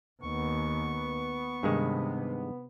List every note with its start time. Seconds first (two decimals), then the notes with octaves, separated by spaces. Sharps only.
0.22 D#2 B3 C#6
1.63 G2 C3 D#3 G#3